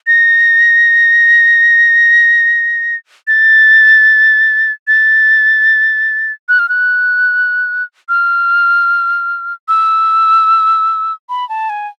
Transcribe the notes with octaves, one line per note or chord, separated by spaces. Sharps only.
A#6
A6
A6
F#6
F6
F#6
F6
E6
B5
A5
G#5